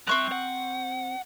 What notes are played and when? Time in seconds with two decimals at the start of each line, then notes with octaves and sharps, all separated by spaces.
0.07 G2 C4 E5 C#6 F#6
0.32 F#5